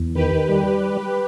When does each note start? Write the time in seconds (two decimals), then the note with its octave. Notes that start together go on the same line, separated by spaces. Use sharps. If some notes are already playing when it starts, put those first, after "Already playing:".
Already playing: E2
0.15 D#3 G4 B4
0.49 G3